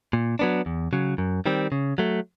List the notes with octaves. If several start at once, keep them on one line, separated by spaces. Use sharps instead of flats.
A#2
F#3 B3 D4
E2
C#3 F#3
F#2
D#3 G3 C4
C#3
F#3 A3